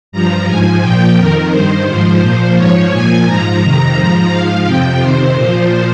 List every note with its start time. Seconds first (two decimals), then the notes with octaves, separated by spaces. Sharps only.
0.12 G2 F3 A#5
0.47 G#2 F3 G#5
0.82 A#2 F3 G5
1.17 F2 D#3 A#4
1.51 G2 D#3 C5
1.87 G#2 F3
2.21 A#2 F3
2.57 G#2 F3 C#5
2.91 A#2 F3 G#5
3.26 G#2 F3 A#5
3.61 F2 C3 D#3
3.96 G#2 F3
4.31 G#2 F3 F5
4.66 F2 C3 F3 G5
5.01 F2 C3 D#3 C5
5.36 A#2 F3 C5